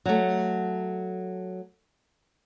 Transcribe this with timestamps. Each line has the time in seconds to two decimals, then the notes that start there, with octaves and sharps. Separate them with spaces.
0.05 F#3 A3